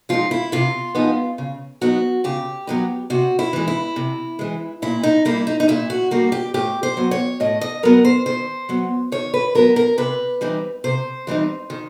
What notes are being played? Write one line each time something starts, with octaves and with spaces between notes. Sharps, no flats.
F3 G#3 B3 D#4 F4
E4
C3 F4
F3 G#3 B3 D#4
C#3
F#3 B3 D#4 F#4
C#3 G4
F#3 B3 D#4
C3 F#4
E4
E3 G#3
E4
C3
E3 G#3
A#2 E4
D#4
G3 A#3 D#4 E4
D#4
D#4
A#2 E4
F#4
G3 A#3 D#4 F#4
G4
A2 G4
C5
F#3 B3
C#5
A2 D#5
D#5
F#3 B3 A#4
C5
D#3 C5
F#3 B3
D#3 C#5
B4
F#3 B3 A#4
A#4
C3 B4
E3 G3 C4 D#4
C3 C5
E3 G3 C4 D#4
D#3